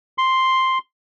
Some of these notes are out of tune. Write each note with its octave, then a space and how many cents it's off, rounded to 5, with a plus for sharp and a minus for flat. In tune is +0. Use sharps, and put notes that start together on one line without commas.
C6 +0